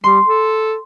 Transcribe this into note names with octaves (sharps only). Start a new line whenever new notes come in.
G3 C6
A4